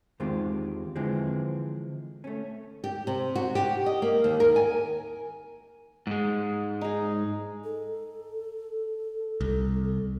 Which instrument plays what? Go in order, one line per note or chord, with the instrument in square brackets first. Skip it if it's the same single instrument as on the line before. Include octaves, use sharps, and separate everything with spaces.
[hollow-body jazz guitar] E2 D#3 G#3 C4 F4 G4
D3 E3 F3 G#3 C4
A3 C#4
[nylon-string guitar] G4
C3
F#4
G4
D#5
A#3
D#2
A#4
G#5
[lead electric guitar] G#2 G#3
[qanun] D#4 G#4
[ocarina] A4
[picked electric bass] C2